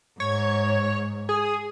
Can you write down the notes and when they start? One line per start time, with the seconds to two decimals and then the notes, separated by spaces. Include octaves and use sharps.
0.20 G#2 C#5
1.29 G#4